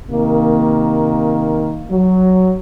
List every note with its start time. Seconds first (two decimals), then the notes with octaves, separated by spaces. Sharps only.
0.10 C3 D#3 A#3
1.90 F#3